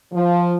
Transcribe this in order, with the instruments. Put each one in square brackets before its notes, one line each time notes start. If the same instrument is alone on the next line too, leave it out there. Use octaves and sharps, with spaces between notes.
[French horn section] F3